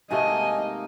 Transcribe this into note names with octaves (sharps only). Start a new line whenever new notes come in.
G#2 C3 A3 A#3 D#4 D#5 G#5